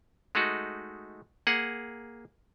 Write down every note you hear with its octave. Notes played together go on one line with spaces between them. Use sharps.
G#3 A3 D#4 F#4
A#3 G#4 F#5